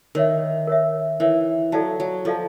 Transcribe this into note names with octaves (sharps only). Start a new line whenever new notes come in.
D#3 A#4 C#5 E5
A#4 C#5 E5
E3 A#4 C#5 E5
F#3 E4 A4 D5 F5 A5
F#3
F3 E4 A4 D5 F5 A5